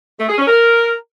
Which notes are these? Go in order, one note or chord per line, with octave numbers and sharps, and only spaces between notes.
A3
G#4
C#4
A#4